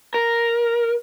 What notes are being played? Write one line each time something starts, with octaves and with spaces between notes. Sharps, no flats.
A#4